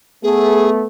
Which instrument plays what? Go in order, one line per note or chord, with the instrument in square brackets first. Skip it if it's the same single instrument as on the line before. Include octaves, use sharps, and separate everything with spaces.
[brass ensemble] A3 B3 [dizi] G#4